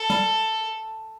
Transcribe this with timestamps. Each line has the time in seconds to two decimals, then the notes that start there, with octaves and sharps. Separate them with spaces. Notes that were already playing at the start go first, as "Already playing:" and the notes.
Already playing: A4
0.10 G3